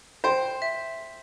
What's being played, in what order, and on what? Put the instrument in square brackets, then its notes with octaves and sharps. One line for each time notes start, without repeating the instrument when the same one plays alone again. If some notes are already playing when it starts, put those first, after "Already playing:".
[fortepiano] C5 [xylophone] G5
[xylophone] E5